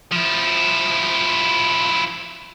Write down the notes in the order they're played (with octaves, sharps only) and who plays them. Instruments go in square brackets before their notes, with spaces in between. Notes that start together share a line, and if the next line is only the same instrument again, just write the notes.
[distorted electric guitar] F3 E4